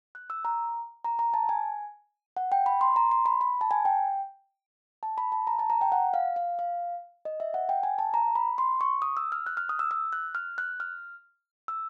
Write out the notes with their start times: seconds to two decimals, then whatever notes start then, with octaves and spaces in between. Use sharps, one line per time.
0.15 F#6
0.30 E6
0.45 A#5
1.04 A#5
1.19 A#5
1.34 A5
1.49 G#5
2.37 F#5
2.52 G5
2.66 B5
2.81 C6
2.96 A#5
3.11 C6
3.26 B5
3.41 B5
3.61 A5
3.71 G#5
3.85 G5
5.03 A5
5.18 B5
5.32 A5
5.47 A#5
5.59 A5
5.70 A#5
5.81 G5
5.92 F#5
6.14 F5
6.36 F5
6.59 F5
7.25 D#5
7.40 E5
7.54 F#5
7.69 G5
7.83 G#5
7.99 A5
8.14 A#5
8.36 B5
8.58 C6
8.81 C#6
9.02 D#6
9.17 E6
9.32 F6
9.46 F#6
9.57 F6
9.69 D#6
9.79 E6
9.91 E6
10.13 F#6
10.35 F6
10.58 F#6
10.80 F6
11.68 E6